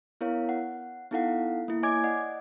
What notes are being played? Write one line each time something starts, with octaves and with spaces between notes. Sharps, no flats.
B3 E4 A#4 C#5 F5
F#5
B3 D#4 E4 A4 F5 F#5
A#3 E4
C#5 D#5 G#5 D6 G#6
D5 D#5 F#5